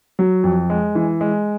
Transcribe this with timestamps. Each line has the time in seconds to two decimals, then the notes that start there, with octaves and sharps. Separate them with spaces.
0.19 F#3
0.44 F2
0.70 G#3
0.95 E3
1.21 G#3